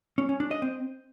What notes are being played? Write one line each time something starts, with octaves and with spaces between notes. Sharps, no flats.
C#4
C#4
D4
D#5
C4